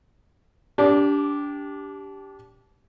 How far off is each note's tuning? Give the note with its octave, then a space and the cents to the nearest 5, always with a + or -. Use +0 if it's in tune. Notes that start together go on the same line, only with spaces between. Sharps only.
D4 -25 G4 +0